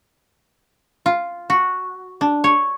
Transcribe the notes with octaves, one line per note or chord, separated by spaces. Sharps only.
F4
F#4
D4
C#5